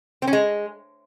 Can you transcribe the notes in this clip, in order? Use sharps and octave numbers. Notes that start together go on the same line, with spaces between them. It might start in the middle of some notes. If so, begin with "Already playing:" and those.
C4
C#4
G#3